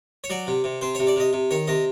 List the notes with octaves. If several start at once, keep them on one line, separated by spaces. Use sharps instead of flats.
C#5
F#3 D5
C3
C3
C3 C5
C3 C#5
D5
C3 D#5
C3
D#3 C#5
C3 D#5